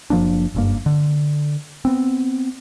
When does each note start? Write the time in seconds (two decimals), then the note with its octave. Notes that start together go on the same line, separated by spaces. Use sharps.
0.10 F#1 F3 A#3 D4
0.55 F#1 G2 A#3
0.86 D3
1.85 B3 C4